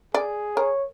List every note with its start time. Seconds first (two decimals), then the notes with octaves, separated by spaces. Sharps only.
0.14 G#4 D5
0.57 A#4 C#5